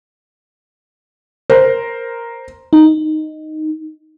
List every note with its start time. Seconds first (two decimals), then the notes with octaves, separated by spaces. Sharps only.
1.50 A#4 C5
2.73 D#4